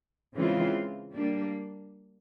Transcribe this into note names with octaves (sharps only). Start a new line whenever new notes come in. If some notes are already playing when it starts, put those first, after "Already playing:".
C#3 E3 G#3 C4 F4
G3 A#3 D4